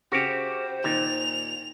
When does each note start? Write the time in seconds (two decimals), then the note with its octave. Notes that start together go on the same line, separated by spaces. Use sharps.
0.12 C#3 F#4 G4 C5
0.84 A#2 D#3 F7